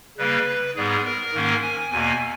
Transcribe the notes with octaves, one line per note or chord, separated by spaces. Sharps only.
C#3 G3 A#3 B4
G#2 G3 B3 G#4
A#4
G#2 D#3 A#3 C#4
G#5
E2 B2 A#3 G#5